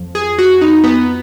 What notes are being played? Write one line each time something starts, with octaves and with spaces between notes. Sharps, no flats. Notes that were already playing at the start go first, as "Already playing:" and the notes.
Already playing: F2 F3
G#4
F#4
D#4
B3